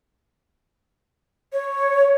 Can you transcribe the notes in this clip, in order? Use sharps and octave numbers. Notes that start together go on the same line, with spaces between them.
C#5